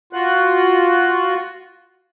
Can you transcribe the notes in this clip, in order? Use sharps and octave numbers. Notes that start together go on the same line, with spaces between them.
F4 F#4 F#6